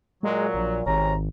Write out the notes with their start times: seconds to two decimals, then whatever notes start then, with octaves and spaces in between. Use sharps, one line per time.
0.23 A#2 F#3 G#3
0.54 A#1
0.86 G#1 C3 C#4 A#5